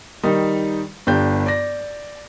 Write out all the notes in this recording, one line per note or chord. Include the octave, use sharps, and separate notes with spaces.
D#3 G3 D#4
G1 D4 G4 G6
D5 A#6